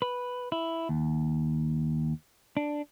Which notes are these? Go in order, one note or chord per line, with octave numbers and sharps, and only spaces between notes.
B4
E4
D#2
D4